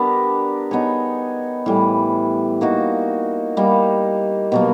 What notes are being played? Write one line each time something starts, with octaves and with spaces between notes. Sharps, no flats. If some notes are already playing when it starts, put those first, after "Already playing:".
Already playing: B3 D4 G4 A#4
B3 D#4 G#4 C#5
A2 E3 G3
A#3 D#4 F#4
G3 A#3 D#4
B2 F#3 A#3